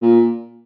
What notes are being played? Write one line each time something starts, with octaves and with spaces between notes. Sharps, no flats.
A#2